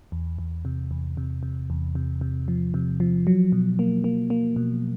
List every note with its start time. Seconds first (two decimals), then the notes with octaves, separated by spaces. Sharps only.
0.12 E2
0.39 E2
0.65 C3
0.91 E2
1.17 C3
1.43 C3
1.70 E2
1.95 C3
2.21 C3
2.48 F3
2.74 C3
3.00 F3
3.27 F#3
3.52 B2
3.79 A#3
4.04 A#3
4.30 A#3
4.56 B2